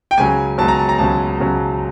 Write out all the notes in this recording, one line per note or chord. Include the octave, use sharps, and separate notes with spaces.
G5
C#2 C#3 F#3 G#5
C#2 C#3 F#3 A5
A#5
A5
A#5
C#2 C#3 F#3 A5
C#2 C#3 F#3